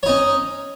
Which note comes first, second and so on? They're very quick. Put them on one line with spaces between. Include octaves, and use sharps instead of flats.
C#5 D#4 C#4